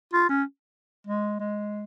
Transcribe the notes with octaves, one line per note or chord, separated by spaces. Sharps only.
F4
C#4
G#3
G#3